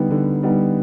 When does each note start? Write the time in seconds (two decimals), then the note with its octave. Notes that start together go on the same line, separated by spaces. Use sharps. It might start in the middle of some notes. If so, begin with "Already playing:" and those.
Already playing: D3 G3 B3 D#4
0.11 D3
0.43 G3 B3 D#4